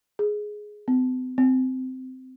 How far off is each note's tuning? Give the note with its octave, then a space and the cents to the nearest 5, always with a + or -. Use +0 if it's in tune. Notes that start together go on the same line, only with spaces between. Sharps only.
G#4 +10
C4 -45
C4 -20